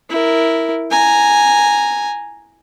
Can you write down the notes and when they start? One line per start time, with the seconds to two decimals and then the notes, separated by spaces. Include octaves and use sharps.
0.10 E4 A#4
0.91 G#5 A#5